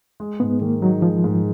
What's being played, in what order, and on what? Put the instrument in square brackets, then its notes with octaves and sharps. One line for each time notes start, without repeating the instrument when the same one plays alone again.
[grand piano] G#3
[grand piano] G#2 [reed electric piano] B3
[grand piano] D#3 [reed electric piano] A#3
[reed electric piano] F#3 [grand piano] D#4
[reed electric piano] F3 [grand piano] G#3
[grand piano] G#2